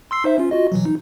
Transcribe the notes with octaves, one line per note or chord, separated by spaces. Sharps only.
C6 E6 C7
D#4 C5 E5
C#4 F4
F4 F#4 D#5
B2 E3 F#3
D#4